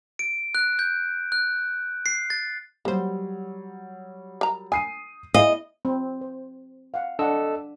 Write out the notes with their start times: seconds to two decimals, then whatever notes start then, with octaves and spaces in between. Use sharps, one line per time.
0.19 D7
0.55 F#6
0.79 G6
1.32 F#6
2.06 C7
2.30 A6
2.85 F#3 G3 A#3 C5
4.41 A#4 A#5
4.72 G#5 D#6 C7 D#7
5.34 E4 G#4 D#5 F5 G#5
5.85 C4
6.21 C5
6.94 F5 F#5
7.19 D4 A4 D#5 F#5 E6